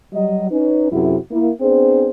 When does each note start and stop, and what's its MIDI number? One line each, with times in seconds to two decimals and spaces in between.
0.13 0.47 54
0.13 0.47 55
0.13 0.47 75
0.50 0.87 61
0.50 0.87 63
0.50 0.87 71
0.91 1.16 42
0.91 1.16 48
0.91 1.16 54
0.91 1.16 64
0.91 1.16 66
0.91 1.16 68
1.30 1.50 58
1.30 1.50 64
1.60 2.10 59
1.60 2.10 60
1.60 2.10 62
1.60 2.10 68
1.60 2.10 72